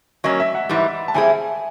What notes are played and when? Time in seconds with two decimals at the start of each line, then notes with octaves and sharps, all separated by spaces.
0.24 F#3 A#3 C#4 D#5
0.40 E5
0.55 F#5
0.69 G#2 E3 G3
1.08 A5
1.14 E3 G3 C4 E4 G#4 G#5